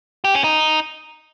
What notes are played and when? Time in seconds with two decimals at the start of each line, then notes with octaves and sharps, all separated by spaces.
0.24 G4
0.34 C#4
0.44 D#4